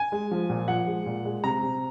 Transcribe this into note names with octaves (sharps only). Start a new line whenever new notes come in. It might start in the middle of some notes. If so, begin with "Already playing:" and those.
Already playing: G#5
G#3
F3
A#2
F3 F#5
G#3
A#2
G#3
C3 A#5
C3